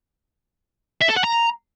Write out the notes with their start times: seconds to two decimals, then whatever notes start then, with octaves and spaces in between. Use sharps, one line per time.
1.02 E5
1.09 A4
1.17 F#5
1.24 A#5